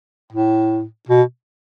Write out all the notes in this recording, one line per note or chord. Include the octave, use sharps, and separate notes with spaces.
A2
B2